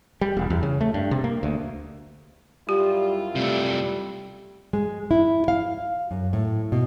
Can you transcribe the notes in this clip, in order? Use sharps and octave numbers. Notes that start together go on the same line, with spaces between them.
G3
E1
E2
C#3
A3
G2
C3
A#3
D2
F#2 G3 E4 F4 G4
C3 G3 A3
G#3
E4
F5
F#2
A2
B2